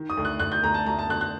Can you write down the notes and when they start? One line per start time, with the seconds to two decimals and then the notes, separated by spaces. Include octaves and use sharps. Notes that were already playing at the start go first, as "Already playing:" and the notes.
Already playing: D#3
0.10 D#6
0.17 D2
0.25 F#6
0.40 D2 F#6
0.52 G6
0.63 D2 A#5
0.74 A5
0.86 D2 A#5
0.99 A5
1.09 D2 F#6
1.21 F#6